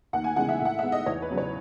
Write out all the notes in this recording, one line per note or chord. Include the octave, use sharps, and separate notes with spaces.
D#2 F#5
G#5
C#3 E3 G#3 B3 F#5
E5
A2 F#5
G#3 B3 E5
D#5
E2 C#5
B4
C#3 F#3 B3
C#5